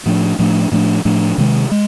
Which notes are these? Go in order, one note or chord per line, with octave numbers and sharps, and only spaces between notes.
A2 F3 A3 D4
A2 F3 A3 D4
A2 F3 A3 D4
A2 F3 A3 D4
C3 D#3 G#3
G#3